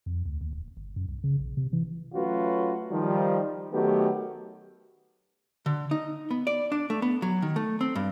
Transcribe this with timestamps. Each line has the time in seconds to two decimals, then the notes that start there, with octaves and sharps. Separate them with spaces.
0.06 F2
0.25 D2
0.41 D#2
0.53 D1
0.77 G1
0.96 F#2
1.08 C2
1.24 C#3
1.39 A#1
1.57 C3
1.73 E3
2.14 F#3 A3 C#4 F4 F#4 B4
2.91 D#3 F3 G3
3.73 D#3 F#3 A3 B3 G4
5.66 D3
5.91 D#4
6.31 B3
6.47 D5
6.72 D4
6.90 A3
7.02 B3
7.22 F#3
7.42 D#3
7.56 A3
7.81 C4
7.95 G2